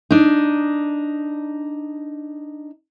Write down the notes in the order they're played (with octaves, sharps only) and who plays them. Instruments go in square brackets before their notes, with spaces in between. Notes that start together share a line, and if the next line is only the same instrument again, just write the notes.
[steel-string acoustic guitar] D4 D#4